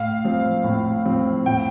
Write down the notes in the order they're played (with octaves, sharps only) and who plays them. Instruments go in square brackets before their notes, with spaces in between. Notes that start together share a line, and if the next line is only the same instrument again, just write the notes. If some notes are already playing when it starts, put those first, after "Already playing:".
Already playing: [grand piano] A2 [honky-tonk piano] F5
[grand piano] F3 C4
A2
F3 C4
[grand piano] A2 [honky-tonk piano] G5